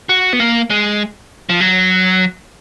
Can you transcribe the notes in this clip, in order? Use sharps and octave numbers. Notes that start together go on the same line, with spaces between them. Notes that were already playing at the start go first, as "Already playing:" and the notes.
F#4
B3
A#3
G#3
F3
F#3